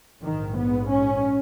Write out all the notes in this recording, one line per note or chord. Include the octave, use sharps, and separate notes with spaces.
A#1 G#2 D#3
B3
C#4